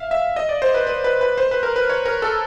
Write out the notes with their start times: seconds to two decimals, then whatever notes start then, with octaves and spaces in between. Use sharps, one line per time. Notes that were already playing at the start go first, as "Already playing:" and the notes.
Already playing: E5 F5
0.11 E5
0.36 D#5
0.49 D5
0.62 C5
0.74 B4
0.87 B4
1.04 B4
1.21 B4
1.38 C5
1.51 B4
1.63 A#4
1.76 B4
1.89 C#5
2.06 A#4
2.22 A4